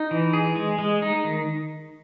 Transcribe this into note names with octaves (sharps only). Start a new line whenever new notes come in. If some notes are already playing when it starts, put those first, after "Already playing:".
Already playing: D#4
E3
G#4
G#3
G#3
D#4
D#3